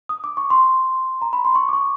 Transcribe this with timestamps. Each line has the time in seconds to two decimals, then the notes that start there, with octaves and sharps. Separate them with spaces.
0.09 D#6
0.24 D6
0.37 C#6
0.50 C6
1.22 A#5
1.33 B5
1.45 C6
1.55 C#6
1.69 D6
1.73 C#6